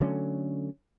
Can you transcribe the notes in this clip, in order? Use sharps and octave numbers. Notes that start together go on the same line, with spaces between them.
D3 F#3 A3 C#4